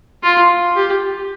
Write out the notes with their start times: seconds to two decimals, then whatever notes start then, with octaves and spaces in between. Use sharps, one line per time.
0.23 F4
0.75 G4